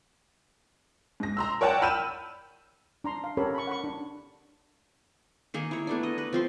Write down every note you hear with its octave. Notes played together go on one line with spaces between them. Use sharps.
G#2 A#6
A#5 C6 E6
A#4 C#5 D5 F#5 G5 A5
B5 E6 F6 G6 D#7 E7
D4 A#5 C6
F5
C#4 G4 A4 A#4 C#5 B5
B5 C#6
F#5 B5 C#6
D4
D#3 A#3 G#4
E4 C#5
A3 B3 D4
D#5
B4
F3 C4 C6